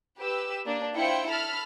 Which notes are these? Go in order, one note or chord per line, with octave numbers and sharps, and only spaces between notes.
G4 B4 E6
A#3 D4
E4 F4 C5 G5 C#7
A4 A5 B5 F6